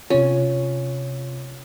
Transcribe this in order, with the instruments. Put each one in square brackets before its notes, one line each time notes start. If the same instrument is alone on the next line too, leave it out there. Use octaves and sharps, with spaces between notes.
[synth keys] C3 F4 [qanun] C#4